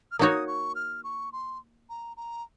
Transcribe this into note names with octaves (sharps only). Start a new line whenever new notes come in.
F6
A#3 D#4 F#4 C#5 D#6
C#6
F6
C#6
C6
A#5
A#5